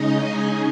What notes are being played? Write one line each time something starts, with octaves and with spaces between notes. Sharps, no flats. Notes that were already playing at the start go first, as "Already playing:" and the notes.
Already playing: C#3 G#3 C#4 D#4 D#5
G#4 G#5